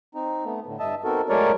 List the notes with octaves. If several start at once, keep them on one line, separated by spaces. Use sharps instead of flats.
C4 D#4
A3 B3
A2 D3
G2 D#5 E5 A5
B3 C4 D#4 F#4 A4 A#4
F#3 G#3 A3 A#4 C#5 D5